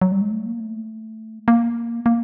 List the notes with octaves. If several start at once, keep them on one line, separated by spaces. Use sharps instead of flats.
F#3
G3
G#3
A3
A#3
A3
A#3
A#3